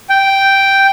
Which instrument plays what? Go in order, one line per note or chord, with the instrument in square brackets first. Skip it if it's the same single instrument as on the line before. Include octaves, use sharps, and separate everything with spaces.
[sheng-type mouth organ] G5